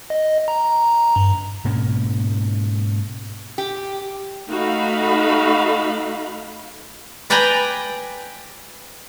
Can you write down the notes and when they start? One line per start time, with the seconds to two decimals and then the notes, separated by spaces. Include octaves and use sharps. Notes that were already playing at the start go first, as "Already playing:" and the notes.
0.10 D#5
0.48 A#5
1.16 G2
1.65 G#2 B2 A#3 C#4
3.58 G4
4.50 A3 D#4 F#4 F5 B5
7.30 B4 D5 G5 G#5 A#5 B5